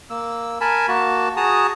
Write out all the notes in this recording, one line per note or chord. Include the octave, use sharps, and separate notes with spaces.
A#3 E6
A#4 G#5 A5 B5
A#3 F#4 A5
F#4 G#4 A5 A#5 D#6